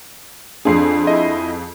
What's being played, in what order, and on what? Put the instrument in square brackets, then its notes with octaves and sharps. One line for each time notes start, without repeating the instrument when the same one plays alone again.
[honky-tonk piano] F2 G#4 [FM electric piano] D4 C6 C7
[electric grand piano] E4 D#5